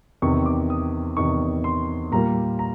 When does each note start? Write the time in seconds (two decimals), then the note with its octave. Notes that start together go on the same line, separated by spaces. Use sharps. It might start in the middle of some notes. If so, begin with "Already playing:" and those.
0.22 E2 C3 D#3 C#6
0.46 D6
0.70 D#6
1.17 E2 C3 D#3 C#6
1.64 C6
2.11 A#2 G3 A#3 A#5
2.59 A#5